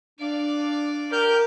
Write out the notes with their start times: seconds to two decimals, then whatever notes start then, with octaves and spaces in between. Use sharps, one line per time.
0.20 D4 D5 F5
1.12 G4 A#4 F6 G6